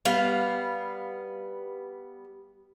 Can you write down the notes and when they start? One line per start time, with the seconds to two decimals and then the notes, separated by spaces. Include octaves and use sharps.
0.05 G3 B3 F5